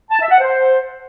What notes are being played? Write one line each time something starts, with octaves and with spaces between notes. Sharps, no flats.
A5
E5
F#5
C5